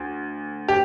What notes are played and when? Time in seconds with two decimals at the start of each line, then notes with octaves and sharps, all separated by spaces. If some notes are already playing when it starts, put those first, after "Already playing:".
Already playing: D2
0.68 G4